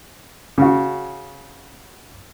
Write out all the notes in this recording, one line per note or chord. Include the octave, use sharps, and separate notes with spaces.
C#3 F#4